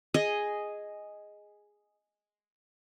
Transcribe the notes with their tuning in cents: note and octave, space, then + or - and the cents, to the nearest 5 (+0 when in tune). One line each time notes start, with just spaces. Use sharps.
G#4 +0 D#5 +0